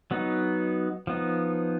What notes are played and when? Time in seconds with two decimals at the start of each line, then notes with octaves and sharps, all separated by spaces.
0.11 F#3 B3 D#4
1.07 F3 B3 D#4